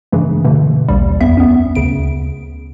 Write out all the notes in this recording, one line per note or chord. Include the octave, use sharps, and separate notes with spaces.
G2 C#3 E3 G#3 A3
B2 D3 E3 A3
A#1 D#2 G3
F2 B3 E5
B3 C#4
D2 C#3 D7